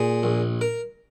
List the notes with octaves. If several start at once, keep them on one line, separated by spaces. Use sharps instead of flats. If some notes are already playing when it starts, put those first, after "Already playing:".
Already playing: A#2 G#4
A#1
A#4